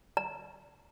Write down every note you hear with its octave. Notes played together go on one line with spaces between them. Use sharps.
A#5